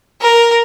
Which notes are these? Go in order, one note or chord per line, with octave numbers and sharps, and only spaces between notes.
A#4